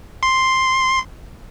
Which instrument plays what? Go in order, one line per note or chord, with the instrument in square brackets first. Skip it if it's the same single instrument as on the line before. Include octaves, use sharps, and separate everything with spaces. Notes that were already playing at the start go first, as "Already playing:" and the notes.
[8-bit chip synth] C6